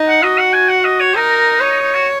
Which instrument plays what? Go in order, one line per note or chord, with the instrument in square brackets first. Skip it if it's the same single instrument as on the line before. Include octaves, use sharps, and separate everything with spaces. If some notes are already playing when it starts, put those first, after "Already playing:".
Already playing: [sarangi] D#4
[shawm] F#5
[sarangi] F#4 [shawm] D#5
[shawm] F#5
G#5
F#5
D#5
C#5
[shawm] D#4 [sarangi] A#4
[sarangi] C#5
[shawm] D#4
F#4